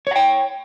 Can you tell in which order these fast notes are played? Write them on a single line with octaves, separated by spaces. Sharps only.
C#5 F#5 G5